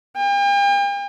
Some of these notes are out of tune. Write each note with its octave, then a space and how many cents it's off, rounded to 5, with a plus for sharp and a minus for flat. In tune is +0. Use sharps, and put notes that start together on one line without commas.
G5 +40